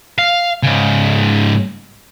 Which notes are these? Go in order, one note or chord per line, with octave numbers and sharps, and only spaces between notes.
F5
G#2 C#3